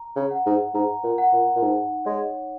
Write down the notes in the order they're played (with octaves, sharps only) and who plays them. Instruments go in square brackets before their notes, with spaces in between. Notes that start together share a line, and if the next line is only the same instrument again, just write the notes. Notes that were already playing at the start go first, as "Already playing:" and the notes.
Already playing: [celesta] A#5
[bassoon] C#3
[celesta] F#5
[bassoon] G#2
[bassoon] G#2 [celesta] A#5
[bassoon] A#2
[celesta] F#5
[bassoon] A#2
A#2
[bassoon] G#2 [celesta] D#4
[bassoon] G#3 [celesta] C#5